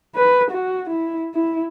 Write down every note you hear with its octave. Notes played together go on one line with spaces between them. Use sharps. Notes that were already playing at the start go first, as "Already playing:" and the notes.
B4
F#4
E4
E4